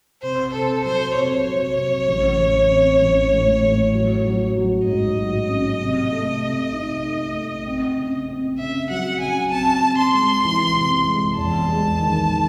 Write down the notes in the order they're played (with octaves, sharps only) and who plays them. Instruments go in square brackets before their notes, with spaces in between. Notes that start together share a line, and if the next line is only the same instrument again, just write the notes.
[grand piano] C3 [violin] C5
[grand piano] C3 [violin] A4
[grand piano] F#3 [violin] C5
[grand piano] C3 [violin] C#5
[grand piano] F#3
C3
A1
A1
C4
A1
A2
A2
F#3
F#3
F#3
[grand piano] G#2 [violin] D#5
[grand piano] F#3
C#4
C3
A3
C3
D#4
A3
A3
C4
C#3
C4
[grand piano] C#3 [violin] E5
[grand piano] F#3 [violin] F#5
[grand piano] C#3 [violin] G#5
[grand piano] C4 [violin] A5
[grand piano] C4
[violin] C6
[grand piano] G#3
E3
C3
G#3
[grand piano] E2 [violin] A5
[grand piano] G#3
D#3
D#3